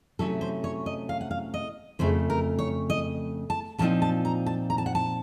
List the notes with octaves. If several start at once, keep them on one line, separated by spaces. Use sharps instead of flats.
C3 F#3 A3 C#4 A4
C5
C#5
D#5
F5
F#5
F5
D#5
F2 C#3 A3 C5
A#4
C#5
D#5
A5
A#2 F3 C4 D#4 A5
A5
A#5
A5
A#5
A5
F#5
A5